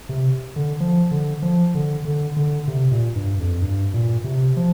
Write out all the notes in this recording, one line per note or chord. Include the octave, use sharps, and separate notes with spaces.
C3
D3
F3
D3
F3
D3
D3
D3
C3
A#2
G2
F2
G2
A#2
C3
F3